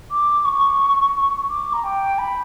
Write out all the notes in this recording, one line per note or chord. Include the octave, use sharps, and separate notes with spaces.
D6
C#6
D6
A#5
G5
B5